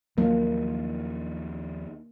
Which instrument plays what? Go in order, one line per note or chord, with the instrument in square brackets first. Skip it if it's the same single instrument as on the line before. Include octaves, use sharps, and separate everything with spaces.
[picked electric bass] D#2 D#3 F3 [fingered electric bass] F#3 [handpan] A#3